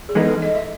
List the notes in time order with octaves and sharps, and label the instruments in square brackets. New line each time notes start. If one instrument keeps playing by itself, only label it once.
[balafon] G#4
[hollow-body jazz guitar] E3 G#3 B3 D#4 [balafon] A4
[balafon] A4
D#5
E5